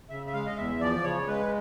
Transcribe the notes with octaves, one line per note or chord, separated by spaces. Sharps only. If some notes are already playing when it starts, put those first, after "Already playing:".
C#3 E5
E5
G#3 F5
D#5
E2 E5
F3 D5
C#3 C#5
G#3 B4